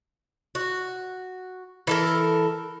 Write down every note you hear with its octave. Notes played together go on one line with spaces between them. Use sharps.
F#4
E3 A4 A#4